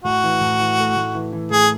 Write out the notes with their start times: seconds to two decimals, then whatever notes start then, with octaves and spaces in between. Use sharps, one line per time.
0.04 A2 F#4
0.23 E3
0.41 A2
0.59 E3
0.79 A3
0.96 A2
1.14 E3
1.32 E3
1.51 A2 G#4